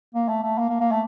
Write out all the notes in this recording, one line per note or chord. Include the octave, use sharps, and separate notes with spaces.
A#3
A3
A3
A#3
A#3
A#3
A3